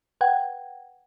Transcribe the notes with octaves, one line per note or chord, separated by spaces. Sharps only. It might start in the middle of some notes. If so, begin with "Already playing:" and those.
B4 F#5 G5 G#6